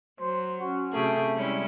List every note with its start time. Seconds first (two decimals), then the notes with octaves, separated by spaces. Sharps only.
0.20 F#3 C5
0.60 C#4 F#4
0.93 C3 A3 G4 G#4
1.36 G3 G#3 C#4 E4